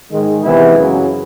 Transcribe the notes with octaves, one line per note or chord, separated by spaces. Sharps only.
G#2 D#3 G#3
C3 E3 G#3 B3 E4
F#2 C#3 F#3